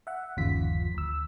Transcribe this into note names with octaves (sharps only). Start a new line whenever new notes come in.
E5 F#5
G1 D#2 C#3 F3 F4 B6
D2 E6